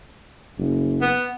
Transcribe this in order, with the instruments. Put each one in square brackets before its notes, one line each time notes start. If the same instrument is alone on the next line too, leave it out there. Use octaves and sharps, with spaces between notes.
[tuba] F#1
[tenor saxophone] B3